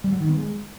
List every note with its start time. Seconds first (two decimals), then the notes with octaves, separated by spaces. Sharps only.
0.04 G3
0.12 F#3
0.21 D#3
0.29 B3
0.37 G#3